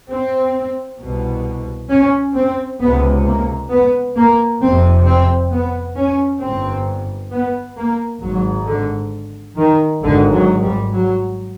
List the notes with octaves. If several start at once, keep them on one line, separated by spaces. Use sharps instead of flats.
C4
C2 B2
C#4
C4
C#2 C3 B3
A#3
B3
A#3
F1 F2 C3 C4
C4
B3
C#4
G1 G2 C4
B3
A#3
G#1 G#2 F#3
D3
D#3
G#1 G#2 D3
F#3
G3
F#3